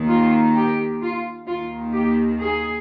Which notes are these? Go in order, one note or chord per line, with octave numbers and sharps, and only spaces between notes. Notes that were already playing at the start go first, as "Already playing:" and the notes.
Already playing: D#2 D#3
F4
G4
F4
D#2 D#3 F4
G4
G#4